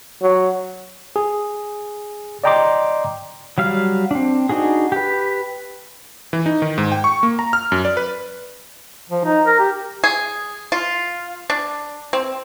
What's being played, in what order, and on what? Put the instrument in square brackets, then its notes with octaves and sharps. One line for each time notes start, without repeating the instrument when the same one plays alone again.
[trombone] F#3
[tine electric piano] G#4
D5 D#5 G5 A#5 C6 D6
[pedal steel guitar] F#3 G3 F5 F6
C4 D4
D4 D#4 F#4 G#4
G4 B4
[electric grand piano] E3
D#4
D#3
G#2
G5
C#6
A#3
A#5
F6
F#2
D5
B4
[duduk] F3
D#4
A#4
G4
[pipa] G#4
F4
D4
C4